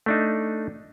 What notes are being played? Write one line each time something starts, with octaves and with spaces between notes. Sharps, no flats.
A3 D4 D#4